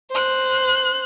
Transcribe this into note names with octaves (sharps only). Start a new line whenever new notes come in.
C5 F#6